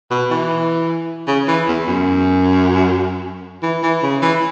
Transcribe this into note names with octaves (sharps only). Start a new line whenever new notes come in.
B2
E3
C#3
E3
E2
F#2
E3
E3
C#3
E3